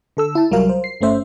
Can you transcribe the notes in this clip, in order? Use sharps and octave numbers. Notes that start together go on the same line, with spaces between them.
D3 A4 E6
E4 A5
C2 F#3 G3 F4 A#4 F5
C5
C7
G1 A3 C#4 C5 E5